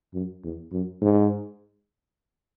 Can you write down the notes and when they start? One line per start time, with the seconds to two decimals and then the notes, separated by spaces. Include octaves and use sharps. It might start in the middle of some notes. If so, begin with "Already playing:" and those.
0.14 F#2
0.44 E2
0.72 F#2
1.02 G#2